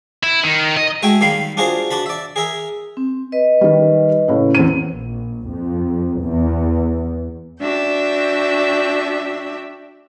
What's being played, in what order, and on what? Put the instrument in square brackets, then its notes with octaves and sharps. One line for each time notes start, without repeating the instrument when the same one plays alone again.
[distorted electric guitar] E4
D#3
D#5
[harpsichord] G#3 A3 F#4 E5 G5 G#5
D#3 G3 F5 B5 C6
D4 F4 F#4 G#4 A#4 C5
D4 F#4 A5 B5
D5 E5
G#4 A#4 E5
[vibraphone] C4
B4 D#5
[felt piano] D#3 G3
A2 C#3
E2 C4 D#7
[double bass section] A#1
F2
E2
[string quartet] D4 F#4 E5 G5